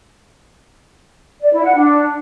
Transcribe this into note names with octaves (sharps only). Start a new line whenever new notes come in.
D5
E4
F#5
D4